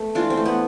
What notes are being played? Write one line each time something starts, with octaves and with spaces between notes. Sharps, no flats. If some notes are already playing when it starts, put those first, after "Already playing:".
Already playing: A3 B3 A4
E3 D4 F4
C4
A3
B3